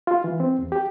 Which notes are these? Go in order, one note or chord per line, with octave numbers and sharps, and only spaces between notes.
F4
E3
C4
E2
G4